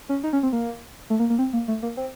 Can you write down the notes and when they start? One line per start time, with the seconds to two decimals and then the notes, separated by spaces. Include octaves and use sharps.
0.09 C#4
0.24 D#4
0.33 C#4
0.43 C4
0.53 A#3
1.10 A3
1.19 A#3
1.30 A#3
1.39 C4
1.53 A#3
1.68 A3
1.83 A#3
1.97 C4